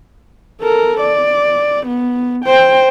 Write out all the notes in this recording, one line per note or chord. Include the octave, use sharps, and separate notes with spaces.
A4 A#4
D5
B3
C5 G5